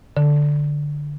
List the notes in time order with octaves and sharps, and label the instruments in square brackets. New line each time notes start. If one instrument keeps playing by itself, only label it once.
[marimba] D3